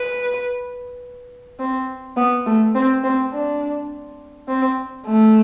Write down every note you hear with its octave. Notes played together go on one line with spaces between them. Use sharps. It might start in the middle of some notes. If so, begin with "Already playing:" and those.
Already playing: B4
C4
B3
A3
C4
C4
D4
C4
A3